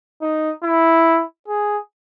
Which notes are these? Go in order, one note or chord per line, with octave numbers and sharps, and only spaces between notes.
D#4
E4
G#4